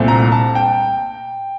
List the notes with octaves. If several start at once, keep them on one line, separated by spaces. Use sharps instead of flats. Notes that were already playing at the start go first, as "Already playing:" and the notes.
Already playing: C2 A#2 A3 C4
A#5
A5
G5